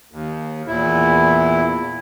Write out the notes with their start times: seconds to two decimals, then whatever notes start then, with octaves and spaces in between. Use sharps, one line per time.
0.11 D#2
0.67 E2 A#2 E4